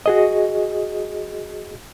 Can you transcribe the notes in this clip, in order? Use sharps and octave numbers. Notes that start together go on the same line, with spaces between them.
F#4 G#4 D#5